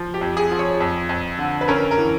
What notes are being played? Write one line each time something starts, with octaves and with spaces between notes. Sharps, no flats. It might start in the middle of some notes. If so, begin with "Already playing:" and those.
Already playing: F3
G4
F2
G#4
F3
C#5
F2
F2
D3
B4
C#4 A#4
A#4
E3